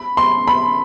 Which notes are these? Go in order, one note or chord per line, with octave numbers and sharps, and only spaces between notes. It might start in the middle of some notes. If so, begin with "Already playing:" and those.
Already playing: B5
C6
B5